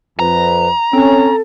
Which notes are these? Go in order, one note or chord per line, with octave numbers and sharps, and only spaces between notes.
F2 B4 A#5
C4 C#4 A4